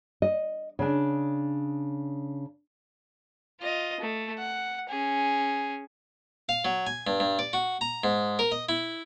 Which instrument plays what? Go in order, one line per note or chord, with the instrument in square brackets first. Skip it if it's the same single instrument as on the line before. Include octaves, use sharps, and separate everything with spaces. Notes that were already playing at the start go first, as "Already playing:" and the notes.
[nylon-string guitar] D#5
C#3 D4
[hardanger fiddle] F4 D#5
A3
F#5
C#4 G#4
[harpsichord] F5
F#3
G#5
G2
G2
D5
F#4
A#5
G#2
A#4
D#5
E4